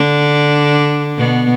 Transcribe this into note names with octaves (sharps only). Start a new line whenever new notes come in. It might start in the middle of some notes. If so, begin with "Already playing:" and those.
Already playing: D3 D4
B2 B3